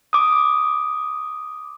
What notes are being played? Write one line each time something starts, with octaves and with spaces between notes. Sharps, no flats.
D6 D#6